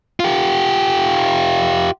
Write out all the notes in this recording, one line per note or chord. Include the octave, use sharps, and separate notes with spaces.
F4 G4